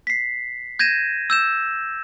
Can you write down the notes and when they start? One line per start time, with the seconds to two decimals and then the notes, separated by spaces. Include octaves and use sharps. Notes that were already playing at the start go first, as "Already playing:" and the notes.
0.07 B6 C7
0.79 G6 G#6 A#6 D#7 E7
1.30 E6 G6 E7